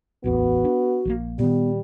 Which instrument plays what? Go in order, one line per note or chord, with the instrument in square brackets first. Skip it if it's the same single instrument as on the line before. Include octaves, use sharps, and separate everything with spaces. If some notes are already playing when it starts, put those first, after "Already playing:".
[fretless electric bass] D1 A1 E2 [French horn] B3 [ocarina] F#4
[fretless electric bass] D4
A#1 F3 A#3
[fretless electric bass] A#2 D#3 [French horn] G3 [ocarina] B3